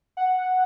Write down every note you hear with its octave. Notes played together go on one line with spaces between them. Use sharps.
F#5